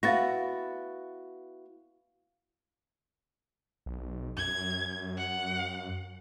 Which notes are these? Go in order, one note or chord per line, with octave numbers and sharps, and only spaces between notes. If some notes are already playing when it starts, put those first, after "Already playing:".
B3 E4 F#4 F5 A6 A#6
B1
F#2 G#6
F#5